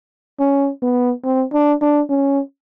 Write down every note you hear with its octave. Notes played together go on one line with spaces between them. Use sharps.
C#4
B3
C4
D4
D4
C#4